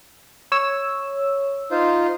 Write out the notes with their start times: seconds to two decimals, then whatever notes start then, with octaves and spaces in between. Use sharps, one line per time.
0.52 C#5 E6
1.71 D#4 F4 C5